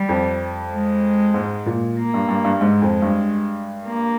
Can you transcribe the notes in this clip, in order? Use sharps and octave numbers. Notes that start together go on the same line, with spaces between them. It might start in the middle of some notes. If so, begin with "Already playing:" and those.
Already playing: G3
F2
G#3
G#2
A#2
A#3
G2
G2
G2
G#2 G#3
F2
G2
A#3